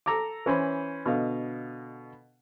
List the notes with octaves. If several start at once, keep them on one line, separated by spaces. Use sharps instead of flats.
A4 A#5 D6
E3 C#4 C5 B5
B2 D3 D#5 F5